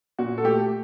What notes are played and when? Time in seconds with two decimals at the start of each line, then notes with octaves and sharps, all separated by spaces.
0.19 A#2 F#4
0.38 A4
0.44 A3 G4